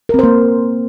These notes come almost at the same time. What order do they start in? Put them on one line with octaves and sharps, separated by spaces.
A#4 C4 C5 A#3